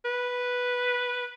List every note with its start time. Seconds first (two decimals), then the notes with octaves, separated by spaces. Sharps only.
0.05 B4